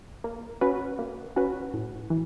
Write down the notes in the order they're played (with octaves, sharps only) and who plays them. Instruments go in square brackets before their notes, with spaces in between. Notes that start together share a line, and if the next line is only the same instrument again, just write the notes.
[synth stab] A#3
C#4 F#4 B4
A#3
C#4 F#4 B4
A2
E3